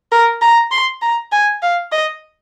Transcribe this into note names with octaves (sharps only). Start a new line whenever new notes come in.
A#4
A#5
C6
A#5
G#5
F5
D#5